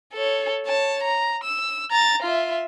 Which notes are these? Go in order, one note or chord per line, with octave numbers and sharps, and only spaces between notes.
A4 C#5
C#5 A5
A#5
E6
A#5 A6
F4 E5